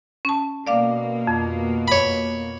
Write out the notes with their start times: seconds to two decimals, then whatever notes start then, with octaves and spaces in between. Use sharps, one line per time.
0.25 C#4 A5
0.67 B2 A#3 D5 F5 D6
1.27 F2
1.88 C#5 B5